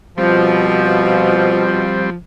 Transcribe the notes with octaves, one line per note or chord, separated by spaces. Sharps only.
B2 F3 G3 C4